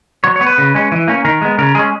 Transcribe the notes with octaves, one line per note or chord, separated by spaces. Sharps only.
F#3 C#5
B3 C#5
B4
C#3
G#3 C#4
E3
A#3 C#4
D#3 A#4
G#3 B3
C#3 A#4
G#3 C#4 G#4